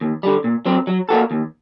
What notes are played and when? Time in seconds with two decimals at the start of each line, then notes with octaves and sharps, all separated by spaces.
0.01 D#2
0.23 D3 G3
0.44 A#2
0.66 F#3 C4
0.87 F#3
1.09 A#3 F#4 A4
1.31 D#2